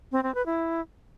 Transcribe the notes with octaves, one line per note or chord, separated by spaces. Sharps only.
C4
C4
B4
E4